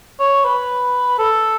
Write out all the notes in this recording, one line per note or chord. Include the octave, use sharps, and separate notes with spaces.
C#5
B4
A4